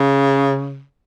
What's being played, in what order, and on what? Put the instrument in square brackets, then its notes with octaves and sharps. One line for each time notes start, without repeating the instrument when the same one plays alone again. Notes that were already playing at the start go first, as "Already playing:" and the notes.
Already playing: [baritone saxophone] C#3